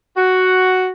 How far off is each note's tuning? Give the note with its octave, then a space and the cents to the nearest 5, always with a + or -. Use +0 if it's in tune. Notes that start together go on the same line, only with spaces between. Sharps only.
F#4 +5